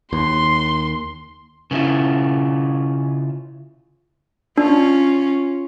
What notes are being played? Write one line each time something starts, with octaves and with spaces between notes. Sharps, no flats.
D#2 C6
C#3 A#3 C4 E4 F4
C#4 D4 F4